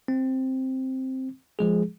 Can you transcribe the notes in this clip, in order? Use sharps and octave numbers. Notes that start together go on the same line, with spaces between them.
C4
F3 G#3 G#4